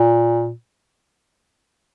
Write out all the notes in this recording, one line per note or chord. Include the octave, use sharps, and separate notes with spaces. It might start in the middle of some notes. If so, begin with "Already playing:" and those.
Already playing: A#2